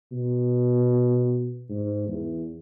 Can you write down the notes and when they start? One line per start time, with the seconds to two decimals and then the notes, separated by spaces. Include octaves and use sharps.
0.12 B2
1.70 G#2
2.08 E2